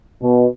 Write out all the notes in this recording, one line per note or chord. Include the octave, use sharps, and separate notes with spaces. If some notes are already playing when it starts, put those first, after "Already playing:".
B2